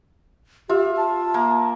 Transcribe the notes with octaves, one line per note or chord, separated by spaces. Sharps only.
F4 G4 E5
A5
A#3